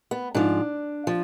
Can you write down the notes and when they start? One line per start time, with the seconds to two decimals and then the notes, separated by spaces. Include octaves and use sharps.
0.11 B3
0.35 G#2 F3 D4
1.07 F3